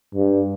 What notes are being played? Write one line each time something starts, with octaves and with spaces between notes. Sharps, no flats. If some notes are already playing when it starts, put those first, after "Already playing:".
G2